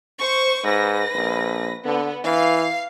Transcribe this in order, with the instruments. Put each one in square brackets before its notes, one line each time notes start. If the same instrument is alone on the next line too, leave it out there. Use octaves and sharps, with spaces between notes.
[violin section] C5 C#6
[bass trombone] G#2 [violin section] B4 A#6
[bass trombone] A#1
[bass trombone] D3 [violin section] B3
[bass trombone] E3 [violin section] F5 C7